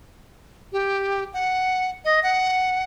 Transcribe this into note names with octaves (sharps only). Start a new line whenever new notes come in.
G4
F#5
D#5
F#5